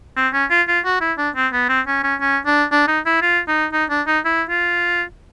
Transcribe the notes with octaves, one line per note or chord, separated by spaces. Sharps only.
C4
C#4
F4
F4
F#4
E4
D4
C4
B3
C4
C#4
C#4
C#4
D4
D4
D#4
E4
F4
D#4
D#4
D4
D#4
E4
F4